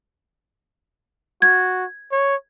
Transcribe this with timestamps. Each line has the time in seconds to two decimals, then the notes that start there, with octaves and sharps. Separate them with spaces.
1.42 F#4 G#6
2.12 C#5